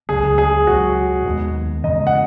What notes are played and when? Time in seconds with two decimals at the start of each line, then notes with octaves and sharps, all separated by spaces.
0.09 C#2 C#3 F#3 G#4
0.38 G#4
0.67 C#2 B2 F#3 F#4
1.25 D#2 D#3 G#3 B3
1.84 E2 C#3 E3 G#3 D#5
2.07 F#5